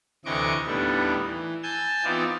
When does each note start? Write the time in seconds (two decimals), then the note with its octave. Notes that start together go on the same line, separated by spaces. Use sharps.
0.25 D2 C3 E3 D#5 C#6 D6
0.67 D#2 A2 G3 A3 B3 D4
1.26 E3
1.63 G#5 A5 E6 G6
2.05 E3 B3 C4 D#4 F4 D5